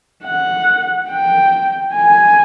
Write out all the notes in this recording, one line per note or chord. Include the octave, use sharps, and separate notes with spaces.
F#5
G5
G#5